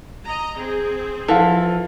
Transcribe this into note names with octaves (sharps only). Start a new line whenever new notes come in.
D#5 A#5
C4 G#4
E3 F3 F4 A4